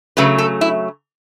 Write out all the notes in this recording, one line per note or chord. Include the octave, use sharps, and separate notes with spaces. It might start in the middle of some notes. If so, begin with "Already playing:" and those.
C#3 F#3 A3 B4
A4
E4